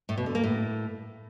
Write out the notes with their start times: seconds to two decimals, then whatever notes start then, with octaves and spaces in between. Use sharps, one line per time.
0.09 A2
0.17 B2
0.26 D3
0.35 A#3
0.44 A2